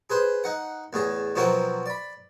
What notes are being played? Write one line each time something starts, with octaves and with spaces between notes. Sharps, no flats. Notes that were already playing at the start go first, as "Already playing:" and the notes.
G#4 B4 C5
D#4 F#5
E2 A2 G#4
B2 F3 F#3 C4 F#4 A#4
D5 B5